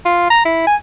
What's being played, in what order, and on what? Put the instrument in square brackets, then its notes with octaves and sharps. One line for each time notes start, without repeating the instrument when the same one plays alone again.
[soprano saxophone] F4
A#5
E4
G#5